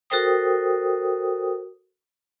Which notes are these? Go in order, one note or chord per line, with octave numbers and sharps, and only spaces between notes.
F#4 A4 A#4 C5 G5 D#6